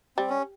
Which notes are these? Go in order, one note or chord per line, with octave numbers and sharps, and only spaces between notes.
G3 C4
C#4